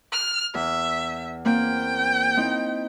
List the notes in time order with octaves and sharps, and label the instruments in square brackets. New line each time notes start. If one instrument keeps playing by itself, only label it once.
[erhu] F6
[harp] E2 [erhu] E5
[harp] A#3 C4 E4 [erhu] G5
[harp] C4 D#4 E4